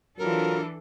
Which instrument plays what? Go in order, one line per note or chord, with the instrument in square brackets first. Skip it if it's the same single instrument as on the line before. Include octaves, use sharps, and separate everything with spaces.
[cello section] E3 D4 A4 [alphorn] F#3 [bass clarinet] F4 [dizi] A#4